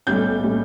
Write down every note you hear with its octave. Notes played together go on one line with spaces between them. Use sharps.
B1 A2 G3 C#4 G6
A2 G3 C#4